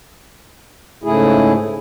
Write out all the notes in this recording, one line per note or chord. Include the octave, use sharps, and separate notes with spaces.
G#2 C#3 A3 E4 G#4